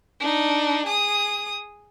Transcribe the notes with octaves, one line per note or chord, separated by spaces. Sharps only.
D4 D#4
G#4 D#6